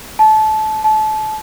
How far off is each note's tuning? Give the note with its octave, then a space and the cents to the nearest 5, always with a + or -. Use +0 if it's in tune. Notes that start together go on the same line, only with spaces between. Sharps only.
A5 -25
A5 -30